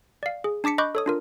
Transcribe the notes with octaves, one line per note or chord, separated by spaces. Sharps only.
D5 F5
G#4
D4 A5 D6 B6 C#7
D#5 B5 C#6 D6 F#6 G6
A4 C#5 D#6
D4 F4 A#4